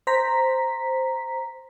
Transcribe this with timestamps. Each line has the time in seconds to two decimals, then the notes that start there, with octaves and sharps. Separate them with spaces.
0.07 C5 A#5 B6